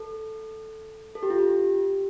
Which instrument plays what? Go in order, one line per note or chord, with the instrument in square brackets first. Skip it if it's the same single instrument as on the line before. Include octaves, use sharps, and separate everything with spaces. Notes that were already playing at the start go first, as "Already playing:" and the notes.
Already playing: [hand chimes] A4
A4
G4
F4
G4